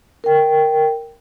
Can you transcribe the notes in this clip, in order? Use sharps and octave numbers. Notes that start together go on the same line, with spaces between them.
A#4 G5